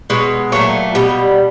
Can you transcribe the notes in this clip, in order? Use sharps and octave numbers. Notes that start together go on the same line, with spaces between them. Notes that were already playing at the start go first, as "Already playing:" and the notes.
B2 G#3 C#5
A#2 F#3 A3 C#5
B2 G3